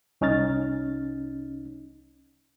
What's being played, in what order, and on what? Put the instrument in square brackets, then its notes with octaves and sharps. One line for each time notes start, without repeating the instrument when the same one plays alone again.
[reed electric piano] C2 C#4 D#4 F6 A6